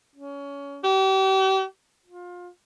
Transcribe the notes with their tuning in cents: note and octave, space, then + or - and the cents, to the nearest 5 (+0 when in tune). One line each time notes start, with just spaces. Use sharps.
C#4 +25
G4 -40
F4 +25